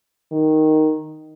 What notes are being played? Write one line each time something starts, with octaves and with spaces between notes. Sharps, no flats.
D#3